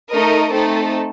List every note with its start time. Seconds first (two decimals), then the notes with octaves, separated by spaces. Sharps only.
0.10 A3 D#4 A#4 D#5
0.52 A3 C4 D#4 A4